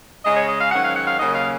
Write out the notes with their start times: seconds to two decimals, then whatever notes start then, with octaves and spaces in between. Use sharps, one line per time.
0.24 C#3 G#3 C#4 D#5
0.37 C#5
0.49 D#5
0.60 F5
0.71 G#2 D#3 F#3 C#4 F#5
0.83 F5
0.95 F#5
1.07 F5
1.20 D#2 C#3 F#3 A#3 C#4 D#5
1.35 F5